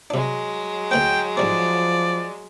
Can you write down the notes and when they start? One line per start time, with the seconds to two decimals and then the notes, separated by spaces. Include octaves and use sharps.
0.10 C3 F#3 G#3 D4
0.91 D2 A#3 C4 G5
1.37 G#2 F3 G3 C4 D5